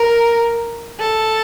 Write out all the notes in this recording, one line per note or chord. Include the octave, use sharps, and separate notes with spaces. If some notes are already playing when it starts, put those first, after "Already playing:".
Already playing: A#4
A4